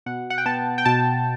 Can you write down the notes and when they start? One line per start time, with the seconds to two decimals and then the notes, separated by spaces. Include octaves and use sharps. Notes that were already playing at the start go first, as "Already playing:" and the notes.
0.06 B2 F#5
0.30 F#5
0.38 G5
0.46 B3 A5
0.78 G5
0.85 B2 A5